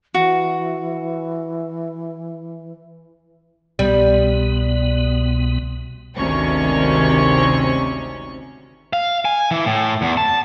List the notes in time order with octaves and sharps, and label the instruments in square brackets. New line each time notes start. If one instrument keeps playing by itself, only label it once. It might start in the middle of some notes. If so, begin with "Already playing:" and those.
[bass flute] E3 [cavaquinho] F#4
[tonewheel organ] C2 B2 B3 [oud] G3
[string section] G#1 D2 C3 D#3 C#4 C#6
[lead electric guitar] F5
G#5
E3
A2
E2
A5